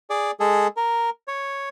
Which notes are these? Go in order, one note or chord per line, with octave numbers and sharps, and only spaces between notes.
G#4 D5
G#3 G#4 A4
A#4
C#5